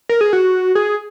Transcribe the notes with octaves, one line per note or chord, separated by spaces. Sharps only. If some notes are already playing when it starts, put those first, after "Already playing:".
A#4
G#4
F#4
G#4